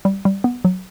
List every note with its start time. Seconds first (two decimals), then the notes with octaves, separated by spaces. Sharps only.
0.05 G3
0.25 G3
0.44 B3
0.65 F#3